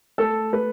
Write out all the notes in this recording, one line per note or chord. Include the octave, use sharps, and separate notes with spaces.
A3 A4
A3 B4